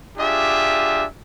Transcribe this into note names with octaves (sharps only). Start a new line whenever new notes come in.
D4 F4 G4 G#4 E5